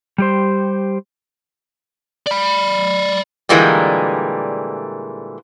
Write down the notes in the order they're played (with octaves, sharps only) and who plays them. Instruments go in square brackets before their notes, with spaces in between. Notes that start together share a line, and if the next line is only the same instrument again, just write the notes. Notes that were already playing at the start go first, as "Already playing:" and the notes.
[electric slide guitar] G3 G4 C5
[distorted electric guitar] D5 B5
[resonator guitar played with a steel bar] A#2 D3 E3 G3 G#3 A#3